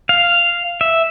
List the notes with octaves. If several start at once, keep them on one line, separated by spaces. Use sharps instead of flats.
F5
E5